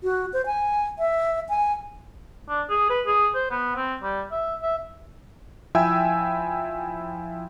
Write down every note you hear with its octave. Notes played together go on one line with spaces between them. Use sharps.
F#4
C5
G#5
E5
G#5
D4
G#4
B4
G#4
C5
B3
C4
G3
E5
E5
F3 E4 E5 G5 G#5 E6